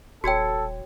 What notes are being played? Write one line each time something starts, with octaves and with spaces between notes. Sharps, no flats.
D#1 F#4 A4 C#5 G5 G#6 C#7